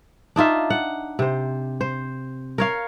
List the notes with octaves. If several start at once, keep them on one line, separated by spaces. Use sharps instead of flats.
D4 D#4 F4 E5
F#5
C3 C5
C5
A#4 C#5 F5